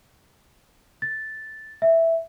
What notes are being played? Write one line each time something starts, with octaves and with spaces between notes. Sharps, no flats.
A6
E5